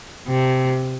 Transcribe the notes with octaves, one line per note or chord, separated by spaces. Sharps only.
C3